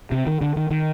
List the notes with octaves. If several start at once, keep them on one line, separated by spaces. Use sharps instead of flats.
C3
D#3
D3
D#3
D#3